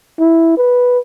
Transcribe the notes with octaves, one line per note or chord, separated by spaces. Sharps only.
E4
B4